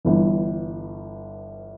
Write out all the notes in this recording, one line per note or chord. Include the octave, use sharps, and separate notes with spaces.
G1 G2 E3